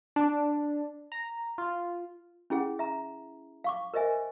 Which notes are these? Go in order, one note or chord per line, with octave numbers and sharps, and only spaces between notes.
D4
A#5
F4
C#4 E4 G#4 F#5
E5 A#5
F5 C#6 D6
A#4 C5 D#5 E5 G#5